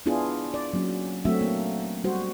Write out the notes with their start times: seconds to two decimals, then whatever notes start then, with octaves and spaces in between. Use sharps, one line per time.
0.06 B3 D4 E4 F4 G#4
0.54 D5
0.73 F#3 A#3 C#4
1.25 F#3 A3 C4 D4 F#4 E5
1.41 A#3
2.04 G3 F#4 C5